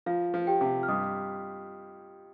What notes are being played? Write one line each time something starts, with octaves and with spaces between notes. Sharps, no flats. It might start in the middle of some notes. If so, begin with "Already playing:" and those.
F3 F4 F5
F3
G4 G5
C3
F6
G2 D#5 D#6